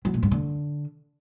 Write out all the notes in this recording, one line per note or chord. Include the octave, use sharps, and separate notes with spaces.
F#3
A#2
G2
D3